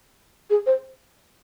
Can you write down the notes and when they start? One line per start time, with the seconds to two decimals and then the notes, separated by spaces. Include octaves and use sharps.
0.50 G#4
0.66 C5